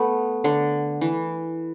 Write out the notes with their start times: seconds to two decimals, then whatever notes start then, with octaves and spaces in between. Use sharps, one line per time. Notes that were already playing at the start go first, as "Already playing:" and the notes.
Already playing: A3 B3
0.44 D3
1.01 E3